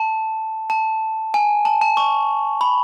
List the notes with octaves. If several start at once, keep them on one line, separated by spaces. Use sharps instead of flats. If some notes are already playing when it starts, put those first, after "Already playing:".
Already playing: A5
A5
G#5
A5
A5
C#6
B5